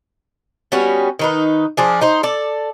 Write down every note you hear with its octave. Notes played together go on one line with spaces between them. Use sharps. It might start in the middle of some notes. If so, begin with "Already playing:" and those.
G3 B3 C#4 F#4
D#3 D#4 B4
F3 D4 G#4
D#4 C5
A4 D5